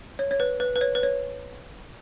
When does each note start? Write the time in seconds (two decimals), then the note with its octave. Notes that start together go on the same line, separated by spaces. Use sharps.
0.19 C#5
0.31 C#5
0.40 B4
0.60 B4
0.76 B4
0.81 C#5
0.95 B4
1.03 C#5